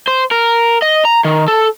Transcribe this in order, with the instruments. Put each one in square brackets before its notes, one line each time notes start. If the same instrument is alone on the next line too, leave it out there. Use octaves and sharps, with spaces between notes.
[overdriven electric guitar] C5
A#4
D#5
A#5
D#3
A4